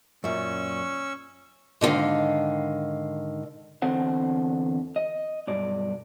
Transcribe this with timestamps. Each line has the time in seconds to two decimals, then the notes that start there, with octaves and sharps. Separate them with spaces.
0.24 F#2 A#2 C#4 C#6 E6
1.81 G#2 D3 D#3 F5
3.82 E2 D3 C4 C5 F#5
4.96 D#5
5.47 B1 G2 D5